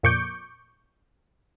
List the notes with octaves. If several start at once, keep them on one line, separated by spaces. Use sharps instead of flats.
F2 A#2 C#6 D6 G6